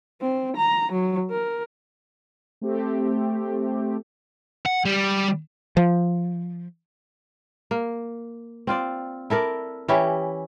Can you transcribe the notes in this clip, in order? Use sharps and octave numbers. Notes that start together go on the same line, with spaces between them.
C4
A#5
F#3
A#4
A3 C4 G4
F#5
G3
F3
A#3
C4 F4 D5
E4 A4 A#4 D5
E3 C#4 E4 G4